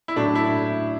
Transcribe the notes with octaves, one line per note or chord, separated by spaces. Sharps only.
E4
A2 F#3 A3 D4
E4